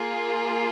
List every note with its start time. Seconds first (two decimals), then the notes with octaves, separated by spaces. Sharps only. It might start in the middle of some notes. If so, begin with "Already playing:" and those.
Already playing: A#3 F4 G#4